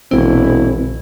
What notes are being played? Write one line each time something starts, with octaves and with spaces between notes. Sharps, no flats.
E1 A#1 D3 C4 E4